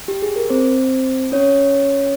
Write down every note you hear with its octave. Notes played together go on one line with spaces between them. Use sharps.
G4
G#4
A#4
C4 C5
C#4 C#5